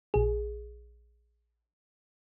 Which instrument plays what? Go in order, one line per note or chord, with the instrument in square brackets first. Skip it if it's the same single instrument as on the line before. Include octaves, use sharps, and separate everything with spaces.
[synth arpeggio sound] A#1 G#4